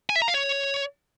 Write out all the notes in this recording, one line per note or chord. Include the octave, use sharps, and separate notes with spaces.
G#5
E5
A#5
F5
C#5